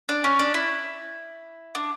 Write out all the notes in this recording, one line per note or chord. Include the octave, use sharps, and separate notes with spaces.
D4
C#4
D4
E4
D4